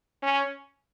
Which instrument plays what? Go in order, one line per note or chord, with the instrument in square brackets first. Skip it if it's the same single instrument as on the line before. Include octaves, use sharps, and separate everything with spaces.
[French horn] C#4